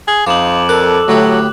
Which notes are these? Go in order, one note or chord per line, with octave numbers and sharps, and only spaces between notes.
G#4
F2 D#4 F4 D6 E7 F#7
D4 A4 A#4 D6 F#6
D2 A2 F#3 G4